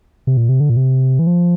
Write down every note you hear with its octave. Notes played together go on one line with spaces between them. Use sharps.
C3
A#2
C3
D3
A#2
C3
E3
F3